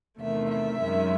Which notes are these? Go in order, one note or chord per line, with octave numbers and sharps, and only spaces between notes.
E2 C3 D#3 A3 E5
E5
F#2 D#3 G#3